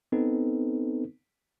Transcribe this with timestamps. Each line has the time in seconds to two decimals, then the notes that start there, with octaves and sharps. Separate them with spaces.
0.12 B3 C4 D#4 A4 B4